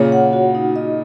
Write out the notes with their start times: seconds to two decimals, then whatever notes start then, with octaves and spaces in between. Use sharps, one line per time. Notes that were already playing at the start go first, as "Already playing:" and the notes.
Already playing: A#2 C#3 C#5
0.12 F#5
0.33 F#4
0.55 D#4
0.76 D#5